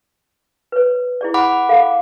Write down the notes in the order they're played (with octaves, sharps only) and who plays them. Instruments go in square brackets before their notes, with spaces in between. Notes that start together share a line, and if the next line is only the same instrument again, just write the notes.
[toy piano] B4 C#5
E4 G#4 D5
[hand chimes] F#5 B5 D6
[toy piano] A4 F5